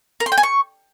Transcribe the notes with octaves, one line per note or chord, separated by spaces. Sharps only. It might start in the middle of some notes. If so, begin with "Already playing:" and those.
A#4
C6
G5
G#5
C#6